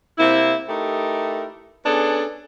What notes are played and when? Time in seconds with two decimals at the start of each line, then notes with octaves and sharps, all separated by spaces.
0.18 C3 A#3 E4
0.68 A3 D#4 E4 G4 A#4
1.85 B3 C#4 D4 G#4 A4